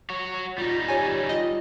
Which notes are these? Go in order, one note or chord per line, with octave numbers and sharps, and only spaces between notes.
F#4 C#5
G3 D#4 F4
G4 C#5 G#5
F4 D#5